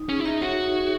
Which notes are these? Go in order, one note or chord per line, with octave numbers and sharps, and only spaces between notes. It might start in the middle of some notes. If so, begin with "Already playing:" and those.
Already playing: D#4
C#4 G#4
E4
D#4 E5
F#4 C#5
D#4
G#4